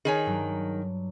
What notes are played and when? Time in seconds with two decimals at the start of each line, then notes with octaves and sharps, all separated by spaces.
0.05 D#3 G#4 C#5 G#5
0.26 G2 F#3 D4